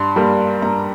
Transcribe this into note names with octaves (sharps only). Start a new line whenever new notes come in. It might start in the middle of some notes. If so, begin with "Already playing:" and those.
Already playing: G2 C6
G3 A#3
G2 A#5